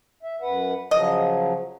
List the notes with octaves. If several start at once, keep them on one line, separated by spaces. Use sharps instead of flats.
E5
F#2 B4 F#5
C#3 F3 F#3 D#5